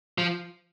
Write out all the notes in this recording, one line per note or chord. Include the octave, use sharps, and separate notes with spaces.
F3